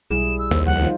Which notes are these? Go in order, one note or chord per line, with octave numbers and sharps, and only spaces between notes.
B1 G3 E4 G#4 E7
E6
D#2 C5
C#2 F3 G3 F#5
D#4 F4 C5